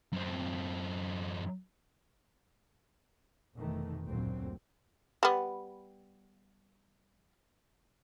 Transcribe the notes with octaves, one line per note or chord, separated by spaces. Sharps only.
F#2 C4
F1 B2 D#3 E3 A3
F#1 D2 A#2 F#3 C4
G3 B3